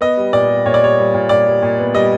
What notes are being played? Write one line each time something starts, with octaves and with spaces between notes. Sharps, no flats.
B3 D#5
G3
A#2 D5
G3
A#2 C#5
D5
G3 C#5
G3
A#2
A#2 D5
G3
A#2
B3
G3 D#5